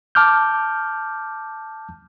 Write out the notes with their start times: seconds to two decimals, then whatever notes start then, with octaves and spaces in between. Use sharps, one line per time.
0.15 A5 D6 F6 G6